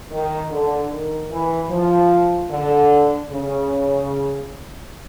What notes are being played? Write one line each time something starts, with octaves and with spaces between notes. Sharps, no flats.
D#3
D3
D#3
E3
F3
D3
C#3